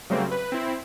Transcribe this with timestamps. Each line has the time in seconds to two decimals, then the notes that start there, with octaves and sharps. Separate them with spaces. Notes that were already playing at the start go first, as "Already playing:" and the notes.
0.10 C#3 F#3 G3 A3 A#3 C4
0.31 B4
0.52 C4 E4